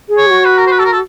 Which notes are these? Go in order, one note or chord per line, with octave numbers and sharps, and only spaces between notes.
G#4
C#5
G4
F#4
B4
A#4
C5
B4
A4
A#4
A4